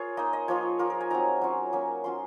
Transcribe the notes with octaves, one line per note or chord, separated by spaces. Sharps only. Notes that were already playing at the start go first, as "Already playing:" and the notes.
Already playing: F4 G#4 A#4 C#5
A#3 D#4 D#5
D#5
F3 A#3 F4 C#5
A#3 F4 A#4
A#4
G#5
F#3 C4 D#4 A#5
F#3 C#4 F4
F#3 A#3 C#4
F#3 C#4 F4 C6